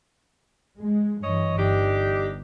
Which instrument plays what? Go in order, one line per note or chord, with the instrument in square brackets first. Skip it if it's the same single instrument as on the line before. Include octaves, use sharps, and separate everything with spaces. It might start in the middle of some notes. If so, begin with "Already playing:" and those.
[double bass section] G#3
[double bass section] G2 E3 [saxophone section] C#5 D#5
[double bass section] G1 [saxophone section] D4 D#4 G4